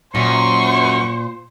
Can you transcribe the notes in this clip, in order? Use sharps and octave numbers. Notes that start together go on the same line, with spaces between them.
F#2 A#2 C5 C#6